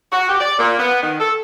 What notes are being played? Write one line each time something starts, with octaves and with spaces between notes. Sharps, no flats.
F#4
G4
D5
A#2
B3
D#3
A4